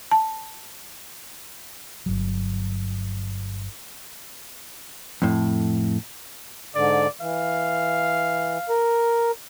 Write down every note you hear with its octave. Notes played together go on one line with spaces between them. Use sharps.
A5
G1 F#3
F2 A2
G#2 D3 D5
E3 F5
A#4